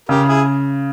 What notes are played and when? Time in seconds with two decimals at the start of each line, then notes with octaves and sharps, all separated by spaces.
0.09 C#3 G4 A#4
0.28 E4 G#4